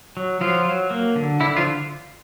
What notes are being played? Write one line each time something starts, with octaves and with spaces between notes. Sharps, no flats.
F#3
F3 F#3 F4
F#3
A#3
D3
D3 E4
F3 F4